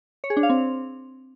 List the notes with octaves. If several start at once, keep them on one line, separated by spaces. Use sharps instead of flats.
C#5
G#4
D4
F5
C4